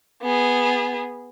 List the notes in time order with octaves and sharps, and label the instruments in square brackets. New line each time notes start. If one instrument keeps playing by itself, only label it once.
[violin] B3 G#4